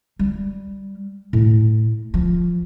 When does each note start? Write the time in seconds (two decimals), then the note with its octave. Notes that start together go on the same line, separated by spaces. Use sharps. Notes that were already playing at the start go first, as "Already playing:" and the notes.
0.19 G3
1.33 A2
2.14 F3